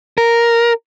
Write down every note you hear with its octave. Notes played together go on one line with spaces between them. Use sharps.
A#4